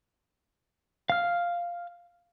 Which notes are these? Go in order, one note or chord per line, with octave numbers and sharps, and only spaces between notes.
F5 F6